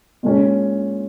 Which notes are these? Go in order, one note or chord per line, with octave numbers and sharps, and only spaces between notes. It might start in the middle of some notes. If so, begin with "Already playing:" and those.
A#2 G#3 C#4